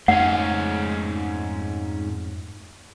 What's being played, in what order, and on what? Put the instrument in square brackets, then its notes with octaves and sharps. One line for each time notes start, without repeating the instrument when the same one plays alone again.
[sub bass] F2 [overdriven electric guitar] G#2 C#4 [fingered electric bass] A3 [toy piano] F#5